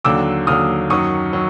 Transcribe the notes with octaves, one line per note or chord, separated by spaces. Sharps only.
D#2 D3 F#3 D6 E6
D#2 D3 F#3 D#6 F6
F#2 D#3 F#3 C#6 D#6
D#3 F#3